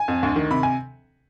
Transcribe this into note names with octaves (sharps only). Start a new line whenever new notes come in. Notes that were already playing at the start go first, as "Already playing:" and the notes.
Already playing: G#5
F2
D2
D#3
C3 B5
G#5